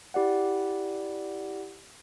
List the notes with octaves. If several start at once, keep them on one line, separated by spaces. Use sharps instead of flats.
E4 G4 D5 F#5